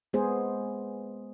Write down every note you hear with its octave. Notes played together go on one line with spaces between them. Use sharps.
G#3 B3 G#4 C5